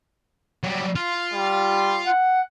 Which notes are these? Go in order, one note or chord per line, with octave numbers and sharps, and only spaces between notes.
F#3 G3
F4
G3
F#5